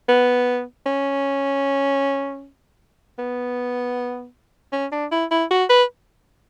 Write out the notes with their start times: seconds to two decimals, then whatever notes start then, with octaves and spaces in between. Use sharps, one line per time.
0.09 B3
0.86 C#4
3.18 B3
4.73 C#4
4.92 D4
5.11 E4
5.31 E4
5.51 F#4
5.70 B4